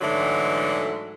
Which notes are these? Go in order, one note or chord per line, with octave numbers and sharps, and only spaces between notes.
G#2 D3 E3 F#3 A3